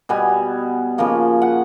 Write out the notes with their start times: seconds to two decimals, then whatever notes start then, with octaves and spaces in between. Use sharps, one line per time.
0.09 B2 G3 B3 G#5
0.98 C#3 F3 A#3
1.42 F#5